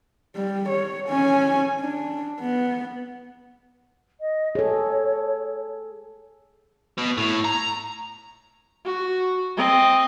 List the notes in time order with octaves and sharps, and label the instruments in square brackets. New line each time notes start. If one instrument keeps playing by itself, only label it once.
[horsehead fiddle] G3
C#5
C#4 G#5
D4
B3
[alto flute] D#5
[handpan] G#4 A4 [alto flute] C#5
[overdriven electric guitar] B2
A2
A#5
[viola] F#4
C4 D#5